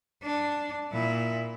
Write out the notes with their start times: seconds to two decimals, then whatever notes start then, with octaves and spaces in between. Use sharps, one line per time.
0.23 D4
0.92 A#2 E4